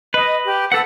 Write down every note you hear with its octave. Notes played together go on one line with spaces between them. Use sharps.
B4 D#5
G4
A4 B4 F#5 E6